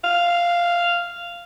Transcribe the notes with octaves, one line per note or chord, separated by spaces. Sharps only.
F5